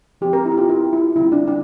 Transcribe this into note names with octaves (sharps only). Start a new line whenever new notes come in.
F3 C4 G4
A#4
E4
G4
F4
E4
E4
D3 G3 C4 E4
D4
D4